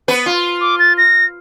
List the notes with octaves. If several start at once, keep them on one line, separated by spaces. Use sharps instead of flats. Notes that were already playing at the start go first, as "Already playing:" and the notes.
B3 B4
F4
D6
A6
A#6